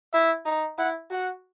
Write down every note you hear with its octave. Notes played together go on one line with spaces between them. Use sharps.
E4 E5
D#4
E4 F#5
F#4 F#5